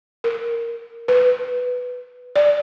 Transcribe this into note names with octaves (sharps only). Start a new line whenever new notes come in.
A#4
B4
D5